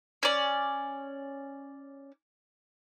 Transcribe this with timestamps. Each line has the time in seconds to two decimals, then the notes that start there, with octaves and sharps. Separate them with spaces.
0.23 C#4 D5